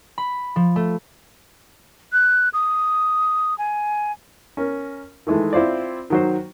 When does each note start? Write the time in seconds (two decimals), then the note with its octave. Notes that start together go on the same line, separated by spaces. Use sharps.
0.18 B5
0.56 F3
0.76 A3
2.13 F#6
2.53 D#6
3.58 G#5
4.57 C#4 A#4
5.27 D#3 E3 G#3 A3
5.53 C4 E4 F4 C5 D5
6.10 D#3 F#3 C5